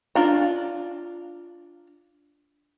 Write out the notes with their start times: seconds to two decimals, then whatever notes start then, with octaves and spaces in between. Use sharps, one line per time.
0.15 D4 F4 A#5